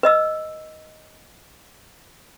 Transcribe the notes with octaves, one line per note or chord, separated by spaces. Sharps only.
B4 D#5 E6